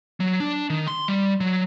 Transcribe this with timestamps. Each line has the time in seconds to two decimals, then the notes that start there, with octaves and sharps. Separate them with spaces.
0.20 F#3
0.40 D4
0.70 D#3
0.88 C6
1.08 G3
1.40 F#3